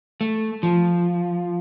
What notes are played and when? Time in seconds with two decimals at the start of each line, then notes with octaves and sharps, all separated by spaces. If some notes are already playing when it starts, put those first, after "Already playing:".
0.21 A3
0.63 F3